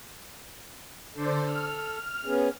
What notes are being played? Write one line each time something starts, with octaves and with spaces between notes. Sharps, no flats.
D3 A4 C5 D5
F6
B3 C#4 G#4